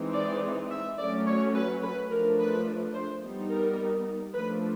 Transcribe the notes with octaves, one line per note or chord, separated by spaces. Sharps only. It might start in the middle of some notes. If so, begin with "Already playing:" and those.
Already playing: E3 G#3 C4 D#4
D5
E5
F#3 A3 C#4 D5
C#5
B4
B4
F3 A3 D4 A#4
B4
C5
G3 B3 D#4
A#4
F3 A3 D4 B4